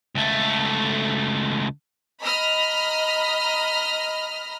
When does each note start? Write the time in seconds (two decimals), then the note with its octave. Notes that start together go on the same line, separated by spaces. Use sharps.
0.15 C#2 A3
2.23 D#5 A#5 B5 D#6 F6